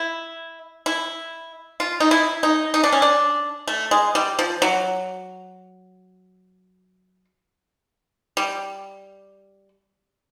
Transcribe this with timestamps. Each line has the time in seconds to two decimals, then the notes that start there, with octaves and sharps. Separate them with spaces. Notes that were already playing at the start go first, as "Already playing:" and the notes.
Already playing: E4
0.86 E4
1.80 F4
2.00 D#4
2.11 E4
2.43 D#4
2.74 D#4
2.83 D4
2.92 C#4
3.02 D4
3.67 A3
3.91 G#3
4.15 G3
4.39 F3
4.62 F#3
8.37 G3